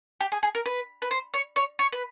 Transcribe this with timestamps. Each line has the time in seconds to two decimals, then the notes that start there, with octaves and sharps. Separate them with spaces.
0.20 G4
0.32 G#4
0.43 G#4
0.55 A#4
0.66 B4
1.02 B4
1.11 C5
1.34 C#5
1.56 C#5
1.79 C#5
1.93 B4